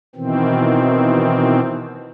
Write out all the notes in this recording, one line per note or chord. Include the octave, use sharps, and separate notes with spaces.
B2 D#3 E3 C4